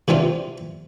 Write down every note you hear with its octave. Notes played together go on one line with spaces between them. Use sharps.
C3 E3 C4 D4 F4